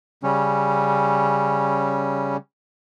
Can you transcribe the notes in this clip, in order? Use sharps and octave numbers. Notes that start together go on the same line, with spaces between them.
C#3 G3 C#4